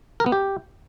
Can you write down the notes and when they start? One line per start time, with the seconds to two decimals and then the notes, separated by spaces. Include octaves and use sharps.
0.20 A#4
0.26 B3
0.32 G4